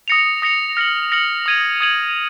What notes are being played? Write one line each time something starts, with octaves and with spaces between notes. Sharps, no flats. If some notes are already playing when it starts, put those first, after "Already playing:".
D#6 A#6 C#7 F7
D#6 A#6 C#7 F7
F6 A#6 C#7 F#7
F6 A#6 C#7 F#7
D#6 G#6 D#7 F#7
D#6 G#6 D#7 F#7